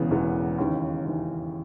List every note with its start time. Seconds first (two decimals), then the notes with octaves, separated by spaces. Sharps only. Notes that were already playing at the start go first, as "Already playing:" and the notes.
Already playing: E1 E2 C#3 E3 B3
0.11 E1 E2 C#3 E3 B3
0.58 D#2 C#3 E3
1.05 D#2 C#3 E3